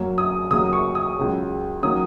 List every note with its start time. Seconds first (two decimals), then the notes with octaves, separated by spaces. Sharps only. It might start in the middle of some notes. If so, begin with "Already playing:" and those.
Already playing: F#2 F#3 A#3 C#4
0.18 D#6
0.51 D#2 C#3 F#3 A#3 D#6
0.73 C#6
0.95 D#6
1.17 C#2 C#3 F#3
1.83 D#3 F#3 A#3 C#4 D#6